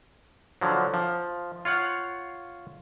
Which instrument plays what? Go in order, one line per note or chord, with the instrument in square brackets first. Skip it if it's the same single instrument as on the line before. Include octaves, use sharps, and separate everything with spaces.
[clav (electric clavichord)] D3 F3 F#3
F3
F4 C#5 F5 F#5